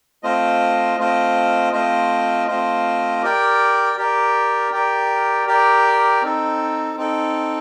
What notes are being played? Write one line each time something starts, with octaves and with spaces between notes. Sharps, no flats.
A3 C4 F4 C5 D#5
A3 C4 F4 C5 D#5
A3 C4 F4 C5 D#5
A3 C4 F4 C5 D#5
G4 A#4 D5 G5
G4 A#4 D5 G5
G4 A#4 D5 G5
G4 A#4 D5 G5
C4 D#4 A4
C4 D#4 A4